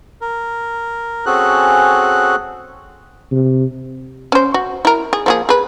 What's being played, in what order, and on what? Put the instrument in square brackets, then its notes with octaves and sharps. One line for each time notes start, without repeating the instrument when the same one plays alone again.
[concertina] A#4
C4 C#4 F#4 G#4 A4 F#6
[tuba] C3
[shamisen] C#4 C5
F#4
E4 A#4
G#4
F3 A#3 G#4
G#4 B4